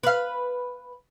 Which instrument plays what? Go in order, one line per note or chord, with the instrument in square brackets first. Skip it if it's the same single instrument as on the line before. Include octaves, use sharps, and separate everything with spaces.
[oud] B4 F5